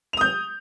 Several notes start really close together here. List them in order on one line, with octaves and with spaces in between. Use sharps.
F7 D#6 G6